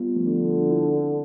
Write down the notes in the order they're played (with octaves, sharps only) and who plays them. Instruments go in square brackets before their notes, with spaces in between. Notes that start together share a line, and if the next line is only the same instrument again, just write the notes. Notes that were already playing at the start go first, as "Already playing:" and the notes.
Already playing: [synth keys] G3 B3 F4
F3 A3
[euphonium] D3 [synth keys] B3 D4
[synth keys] C4 E4